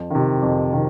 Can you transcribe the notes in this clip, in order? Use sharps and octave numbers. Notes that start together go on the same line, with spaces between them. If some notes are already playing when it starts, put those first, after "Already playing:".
Already playing: F2
C3 D#3
F2
C3 D#3